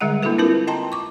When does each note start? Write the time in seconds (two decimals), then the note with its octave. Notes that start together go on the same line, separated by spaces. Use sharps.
0.01 D3 G3 G#3 G#4 D#5 F#5
0.23 A#3 D4 E4 F#4 A4 B4
0.38 C4 D4 E4 F4 A#4 B4
0.67 D#5 G5 A5 A#5 C6
0.92 C#6 D6